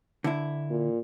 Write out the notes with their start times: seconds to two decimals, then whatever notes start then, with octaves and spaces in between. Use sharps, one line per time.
0.24 D3 E4
0.70 A#2